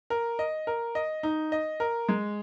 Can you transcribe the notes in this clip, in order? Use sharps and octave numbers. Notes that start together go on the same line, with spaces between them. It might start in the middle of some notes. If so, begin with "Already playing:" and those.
A#4
D#5
A#4
D#5
D#4
D#5
A#4
G#3